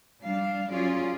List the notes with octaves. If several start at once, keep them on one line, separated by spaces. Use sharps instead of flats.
G3 D4 F5
F#3 C#4 F4 G#4 D5